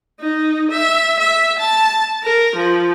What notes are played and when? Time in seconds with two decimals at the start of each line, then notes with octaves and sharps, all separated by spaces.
0.20 D#4
0.71 E5
1.19 E5
1.58 A5
2.23 A#4
2.55 F3